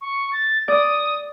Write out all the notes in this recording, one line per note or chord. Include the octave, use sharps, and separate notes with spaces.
C#6
A6
D5 D#6